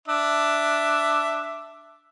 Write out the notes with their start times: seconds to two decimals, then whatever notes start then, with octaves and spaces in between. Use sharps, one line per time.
0.08 D4 E5